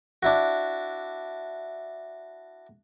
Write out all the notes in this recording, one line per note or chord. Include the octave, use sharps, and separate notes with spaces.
D4 E4 F#4